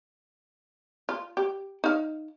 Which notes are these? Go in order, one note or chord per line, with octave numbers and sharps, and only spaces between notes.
F4
G4
D#4 F5